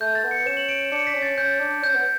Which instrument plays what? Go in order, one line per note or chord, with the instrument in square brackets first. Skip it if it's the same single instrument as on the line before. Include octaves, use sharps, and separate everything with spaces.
[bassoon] A3 [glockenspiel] G6
[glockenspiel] A6
[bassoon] B3
[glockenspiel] C#7
[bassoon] C#4 [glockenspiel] E7
[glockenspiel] F#7
D7
E7
[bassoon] D4 [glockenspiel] C#7
[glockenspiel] B6
[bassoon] C#4
[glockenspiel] A6
[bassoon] C#4 [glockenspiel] G6
[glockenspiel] A6
[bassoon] D4
[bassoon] C#4 [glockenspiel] G6
[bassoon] B3